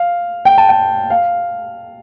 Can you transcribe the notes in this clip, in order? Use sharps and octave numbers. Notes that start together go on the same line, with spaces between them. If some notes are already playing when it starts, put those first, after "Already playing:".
Already playing: F5
G5
A5
G5
F5